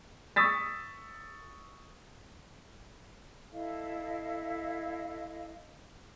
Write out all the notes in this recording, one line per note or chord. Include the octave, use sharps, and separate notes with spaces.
C#6 D#6 E6 A6 B6
E4 A4 D#5 F5